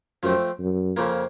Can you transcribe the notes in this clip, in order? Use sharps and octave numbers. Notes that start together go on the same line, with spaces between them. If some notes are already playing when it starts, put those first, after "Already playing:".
F#2 F3 A3 C4
F#2
F2 C#3 F3 A#3